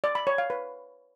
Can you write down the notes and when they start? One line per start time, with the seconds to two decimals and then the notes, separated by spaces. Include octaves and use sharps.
0.04 D5
0.15 B5
0.27 C#5
0.38 F5
0.50 B4